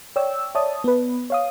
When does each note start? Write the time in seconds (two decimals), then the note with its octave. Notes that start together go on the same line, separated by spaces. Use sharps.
0.16 C#5 D5 G5 E6
0.55 C#5 D5 E5 A5 D#6
0.84 B3 B4
1.30 C#5 F5 D#6